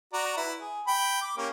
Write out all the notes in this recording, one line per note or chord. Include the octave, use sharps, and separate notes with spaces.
F#4 D5 A#5
E4 B4 B5
G#4
G5 B5
D6
A#3 C#4 G4